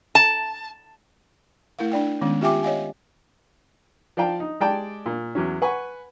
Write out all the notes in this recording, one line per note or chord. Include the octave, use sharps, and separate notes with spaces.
A5
A3 E4 A#4 F5
D4 D5 G5
D#3 G#3 B3 C#4
F4 G4 E5 G5 G#5 D6
C#5 D#5 F5 G#5
F3 D5 F5 G5 A5
D#4
G#3 G4 D5 G5 A5
A#2
E2 F#3 C#4
B4 F#5 G#5 C#6